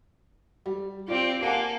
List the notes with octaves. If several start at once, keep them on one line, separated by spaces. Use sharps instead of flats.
G3
C4 F4 G4 D5
A#3 G4 A4 F#5 G#5